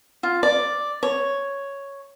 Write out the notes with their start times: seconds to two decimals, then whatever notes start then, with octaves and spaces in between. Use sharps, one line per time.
0.23 F4
0.43 D5
1.03 C#5